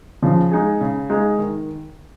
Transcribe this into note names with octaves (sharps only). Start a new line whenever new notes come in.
C#3 F3
G#3 D#4 G#4
C#3
G#3 D#4 G#4
D#3